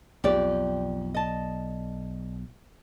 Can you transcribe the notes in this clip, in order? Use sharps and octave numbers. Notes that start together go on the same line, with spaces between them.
B1 F2 G4 D5
D#5 A5